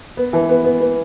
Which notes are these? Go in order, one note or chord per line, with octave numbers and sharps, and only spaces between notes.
B3
E3
B3
B3
B3